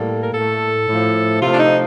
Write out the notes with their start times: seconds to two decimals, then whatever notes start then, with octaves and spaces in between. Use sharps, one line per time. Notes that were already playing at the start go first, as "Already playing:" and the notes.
Already playing: A2 G3 A#3 A4
0.23 A#4
0.33 A2 A3 A4
0.88 A2 F3 A3
1.42 C3 F3 A3 F4
1.51 D4
1.59 D#4